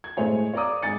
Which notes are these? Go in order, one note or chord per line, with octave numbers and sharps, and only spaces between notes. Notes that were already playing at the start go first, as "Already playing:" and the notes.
G#6
A2 G#3 A3 C5 C#5 G#5
C#5 D5 F5 A#5 D6 D#6
G#2 G#3 G#5 A6 C#7